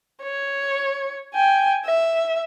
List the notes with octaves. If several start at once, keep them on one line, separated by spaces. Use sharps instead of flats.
C#5
G5 G#5
E5